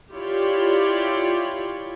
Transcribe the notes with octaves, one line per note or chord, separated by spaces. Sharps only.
E4 F4 G4 C#5 D5